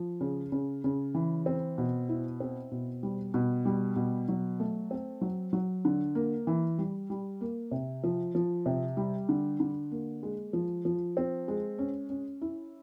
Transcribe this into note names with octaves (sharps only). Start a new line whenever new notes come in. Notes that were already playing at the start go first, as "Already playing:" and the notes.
Already playing: F3
C#3
C#3
C#3
E3
C4
B2
E4
C4
B2
G3
B2
G3
B2
F#3
A3
C4
F#3
F#3
D3
A#3
E3
G3
G3
A#3
C3
F3
F3
C3
G3
D3
D3
A#3
G#3
F3
F3
C4
G#3
C#4
C#4
E4